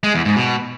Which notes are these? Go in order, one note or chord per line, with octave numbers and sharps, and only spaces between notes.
G#3
E2
G#2
B2